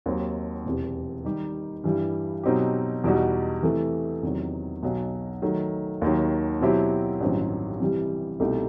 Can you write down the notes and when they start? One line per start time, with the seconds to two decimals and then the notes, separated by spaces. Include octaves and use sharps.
0.06 D#2 D#3 F#3 C4
0.65 E1 E2 C3
1.25 D#3 G3 D#4 G4
1.84 G2 E3 G3
2.43 B2 F#3 C4 D#4 G4
3.04 E2 B2 G3 D#4 F#4
3.63 C3 E3 A3
4.23 E2 C3 D#3 F#3
4.83 B1 B2 F#3
5.42 D#3 F#3 A3
6.02 D#2 D#3 F#3
6.61 B2 F#3 C4 E4 G4
7.20 A1 G2 D#3 F#3 C4
7.80 C3 E3 G3
8.40 C2 B2 A3 D#4 G4